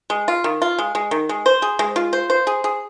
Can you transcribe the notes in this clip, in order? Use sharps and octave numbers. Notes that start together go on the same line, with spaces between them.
G#3
F4
D#3
F4
G#3
G#3
D#3
G#3
C5
G#4
G#3
F4
C5
C5
G#4
G#4